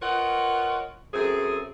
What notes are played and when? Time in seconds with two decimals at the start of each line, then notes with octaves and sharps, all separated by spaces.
0.02 F4 A#4 B4 C#5 D#5 F#5
1.14 F#2 A3 C4 G#4